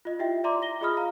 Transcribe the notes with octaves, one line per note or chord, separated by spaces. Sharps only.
F4 D#5
E4 F4 G4 E5 G5
D5 E5 A#5 C6 D6
A#6 G7
F4 G#4 D#5 B5 D#6 F6
F5 A#5